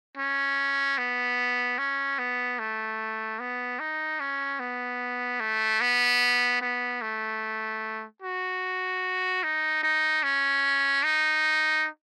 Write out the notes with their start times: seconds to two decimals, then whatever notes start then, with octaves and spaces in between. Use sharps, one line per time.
0.18 C#4
0.98 B3
1.78 C#4
2.19 B3
2.59 A3
3.39 B3
3.80 D#4
4.20 C#4
4.60 B3
5.40 A3
5.81 B3
6.61 B3
7.02 A3
8.22 F#4
9.44 D#4
9.83 D#4
10.23 C#4
11.04 D#4